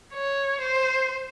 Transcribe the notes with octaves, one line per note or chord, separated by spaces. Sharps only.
C#5
C5